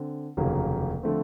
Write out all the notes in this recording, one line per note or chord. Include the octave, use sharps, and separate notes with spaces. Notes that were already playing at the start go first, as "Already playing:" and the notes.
Already playing: D3 C4
F1 D#2 C#3 F#3 A#3
D3 F3 A3 C4